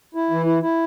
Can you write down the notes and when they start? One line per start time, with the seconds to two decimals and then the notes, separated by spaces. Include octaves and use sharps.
0.15 E4
0.30 E3
0.46 E4
0.62 E4